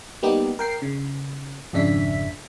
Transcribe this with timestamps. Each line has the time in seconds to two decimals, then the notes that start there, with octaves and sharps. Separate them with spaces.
0.23 G3 A#3 B3 D#4 G4
0.59 A#4 G5 C7
0.82 C#3
1.73 G#1 F2 C#3 D4 E5 B6